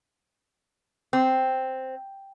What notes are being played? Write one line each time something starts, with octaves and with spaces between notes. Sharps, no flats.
C4